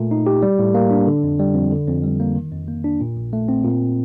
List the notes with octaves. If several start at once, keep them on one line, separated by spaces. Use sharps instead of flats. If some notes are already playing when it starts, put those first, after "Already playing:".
Already playing: A#2 A3
D#4
G4
G3
A2
A#3
D4
D3
F2
G3
F2
D3
F2
G3
A#3
D#3
F2
A#3
D4
A#2
A#1
A3
C4
A#2